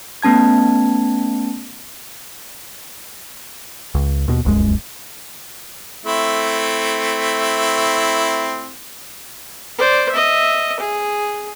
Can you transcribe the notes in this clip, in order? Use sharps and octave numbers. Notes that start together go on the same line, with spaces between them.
A3 B3 C#4 A5 G#6
C#2
D#2 B2
D1 C2 F#2 G#3
A3 C4 E4
C5 D5
D#5 E5
G#4